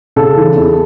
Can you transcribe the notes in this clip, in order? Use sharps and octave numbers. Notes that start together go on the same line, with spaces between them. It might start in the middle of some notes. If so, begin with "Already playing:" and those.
C#3 A4 A5
E3
E2